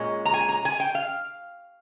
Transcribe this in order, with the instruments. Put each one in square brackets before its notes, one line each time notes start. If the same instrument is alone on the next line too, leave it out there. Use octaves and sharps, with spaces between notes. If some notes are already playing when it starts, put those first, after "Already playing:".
Already playing: [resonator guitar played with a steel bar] A#2 G#3 C#4
A#5
G#5
A#5
G#5
G5
F5